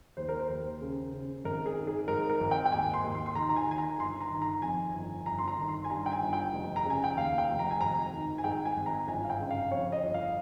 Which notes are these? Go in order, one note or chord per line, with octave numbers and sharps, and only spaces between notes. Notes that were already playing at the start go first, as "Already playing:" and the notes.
D#2 C5
A#4
C5
D#2
C#3
C#3
G#1 A#4
G#4
D#3
G#4
G#2 A#4
A#4
G#1
G5
G5
D#2 G#5
C6
D#2
C6
C6
D#3 A#5
A#5
G#5
D#3 G#5
A#5
G1 C6
A#5
D#3
A#5
F2 G#5
G1
G1 A#5
C6
A#5
D#3
C6
G#5
G2 A#5
G5
G#5
G1
G5
F1
A#5
C#3
G#5
G5
D#2 F5
G5
F1
A#5
G#5
G#1 A#5
D#3
G#5
G#2 G5
G#5
G#1
A#5
G1 G#5
F5
G5
C#3
F5
F2 C#5
D#5
G1
F5